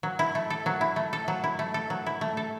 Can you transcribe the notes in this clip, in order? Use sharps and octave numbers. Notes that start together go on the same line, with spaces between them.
F#3
E4
A3
A4
F#3
E4
A3
A4
F#3
E4
A3
A4
F#3
E4
A3
A4